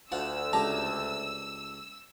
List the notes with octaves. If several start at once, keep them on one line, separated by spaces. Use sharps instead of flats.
D2 F4 F#5 E6
C#2 G4 A5 A#5